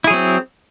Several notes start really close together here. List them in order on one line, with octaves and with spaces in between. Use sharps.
E4 G#4 F#3 C4